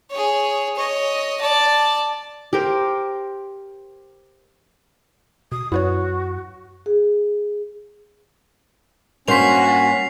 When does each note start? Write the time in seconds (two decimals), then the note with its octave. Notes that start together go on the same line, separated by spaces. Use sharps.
0.10 G#4 C#5
0.76 C#5 D#5
1.41 D5 A5
2.53 G4 A#4 C5
5.52 B2 D#6
5.72 F#2 E4 F#4 B4 C#5
6.86 G#4
9.28 G2 A#3 C#4 F#4 C5 B6 C7 F7